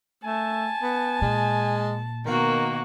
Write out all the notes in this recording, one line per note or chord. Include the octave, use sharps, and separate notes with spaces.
A3 G#5 A5
B3
A#2 G#3
B2 D#3 A#3 F#4